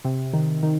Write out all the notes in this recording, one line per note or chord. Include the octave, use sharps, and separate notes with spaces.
C3
D#3
D#3